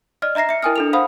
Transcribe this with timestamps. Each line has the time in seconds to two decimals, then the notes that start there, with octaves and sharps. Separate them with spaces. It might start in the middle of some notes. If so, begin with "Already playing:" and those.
0.22 D5 D#5 F6
0.35 D#5 E5 A#5 A#6 C7
0.49 E5 C#7
0.62 E4 A#4 G5 G#5 D#6 F6
0.76 D4 A4 F7
0.93 C5 F5 F#5 B5 D#6